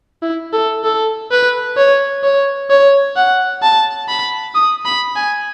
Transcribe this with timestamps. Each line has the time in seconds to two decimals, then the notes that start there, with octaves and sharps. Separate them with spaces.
0.23 E4
0.53 A4
0.84 A4
1.32 B4
1.77 C#5
2.23 C#5
2.70 C#5
3.16 F#5
3.62 A5
4.08 B5
4.55 D#6
4.85 B5
5.16 G#5